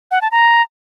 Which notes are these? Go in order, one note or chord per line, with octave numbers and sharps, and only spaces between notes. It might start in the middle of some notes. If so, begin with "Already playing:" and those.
F#5
A5
A#5